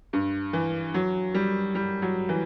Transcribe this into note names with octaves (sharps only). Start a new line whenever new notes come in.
G2
E3
F#3
G3
G3
F#3
E3